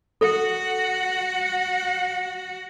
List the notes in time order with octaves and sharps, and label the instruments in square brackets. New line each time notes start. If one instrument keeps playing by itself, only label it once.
[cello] F#4 F#5 [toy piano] A4